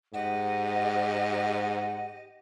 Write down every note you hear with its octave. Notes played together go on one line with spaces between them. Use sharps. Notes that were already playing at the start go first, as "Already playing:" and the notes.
G#2 G4 D#5 F#5